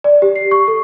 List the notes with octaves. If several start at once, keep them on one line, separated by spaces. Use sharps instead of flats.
D5
G4
C7
C#6
A4